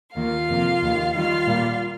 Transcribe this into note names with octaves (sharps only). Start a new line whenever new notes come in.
D#2 D#3 A#3 F4 F5
F2 C3 F3 A#3
D#2 D#3 A#3
D#2 D#3 G3 F4 F5
A#2 G3 A#3